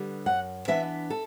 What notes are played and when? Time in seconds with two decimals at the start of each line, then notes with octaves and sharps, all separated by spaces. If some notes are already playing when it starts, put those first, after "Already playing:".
Already playing: D3 G3 B3
0.26 F#2 F#5
0.68 E3 B3 D4 E5
1.10 A4